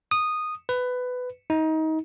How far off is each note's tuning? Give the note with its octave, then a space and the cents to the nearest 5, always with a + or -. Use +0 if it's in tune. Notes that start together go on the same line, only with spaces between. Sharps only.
D#6 -10
B4 +15
D#4 +25